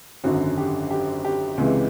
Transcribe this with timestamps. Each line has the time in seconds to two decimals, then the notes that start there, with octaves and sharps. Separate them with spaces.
0.24 G#1 F#2 D3 F#4
0.58 G4
0.90 G4
1.25 G4
1.58 C#2 C3 E3 G#3